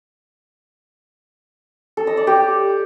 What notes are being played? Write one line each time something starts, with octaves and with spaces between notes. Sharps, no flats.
A4
D#5
D5
G4